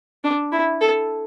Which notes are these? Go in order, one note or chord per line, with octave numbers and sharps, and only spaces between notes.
D4
E4
A4